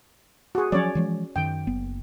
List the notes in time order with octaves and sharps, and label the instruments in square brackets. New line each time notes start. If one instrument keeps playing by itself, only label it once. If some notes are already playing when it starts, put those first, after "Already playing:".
[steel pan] F#4 G#4
[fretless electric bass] F3 F#3 [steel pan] C#4 C#5 D5
[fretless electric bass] E3 F3 G#3
[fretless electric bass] F#2 D#3 [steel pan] G5
[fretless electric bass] F#1 B3